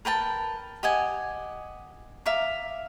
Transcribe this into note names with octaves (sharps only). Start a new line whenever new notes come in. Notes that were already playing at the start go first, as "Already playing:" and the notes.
A#4 B4 G5 A5
G4 D#5 F#5 G#5
E5 F5 A#5 D6